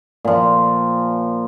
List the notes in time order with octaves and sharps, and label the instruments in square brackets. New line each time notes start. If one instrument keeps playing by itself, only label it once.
[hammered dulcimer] A#2 F3